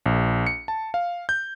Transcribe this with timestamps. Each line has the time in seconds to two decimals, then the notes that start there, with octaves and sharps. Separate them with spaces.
0.06 A#1
0.47 C#7
0.68 A5
0.94 F5
1.29 G6